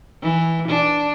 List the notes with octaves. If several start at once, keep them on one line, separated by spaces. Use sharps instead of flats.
E3
D4